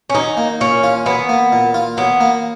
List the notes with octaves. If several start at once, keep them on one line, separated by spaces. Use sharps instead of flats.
C#4
F#3 D#4
A#3
A#2 C#4
F4
F#3 B3
A#3
A#2
F4
F#3 B3
A#3